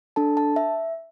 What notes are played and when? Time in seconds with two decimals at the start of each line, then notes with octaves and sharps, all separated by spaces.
0.16 D4 A4 A5
0.37 A5
0.56 E5